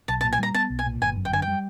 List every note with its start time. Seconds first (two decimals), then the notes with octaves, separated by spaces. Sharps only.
0.08 B1 A5
0.21 A5
0.24 A#2
0.33 G#5
0.39 G3 A#5
0.54 B3 A5
0.70 B1
0.79 G#5
0.86 A#2
1.01 G1 G#5
1.17 F#2
1.25 G5
1.32 D3 G#5
1.42 G5
1.48 G3